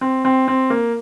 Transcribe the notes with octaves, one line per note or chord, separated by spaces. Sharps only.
C4
C4
C4
A#3